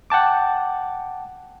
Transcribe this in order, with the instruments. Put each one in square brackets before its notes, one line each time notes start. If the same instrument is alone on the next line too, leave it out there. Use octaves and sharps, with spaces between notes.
[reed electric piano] F#5 G5 A5 D6